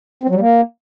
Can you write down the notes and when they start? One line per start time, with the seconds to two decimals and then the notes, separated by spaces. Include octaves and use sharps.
0.24 C4
0.29 F#3
0.35 G3
0.41 A#3